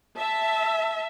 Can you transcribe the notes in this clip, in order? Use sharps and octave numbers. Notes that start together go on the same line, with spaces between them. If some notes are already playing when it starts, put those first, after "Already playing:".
E5 A5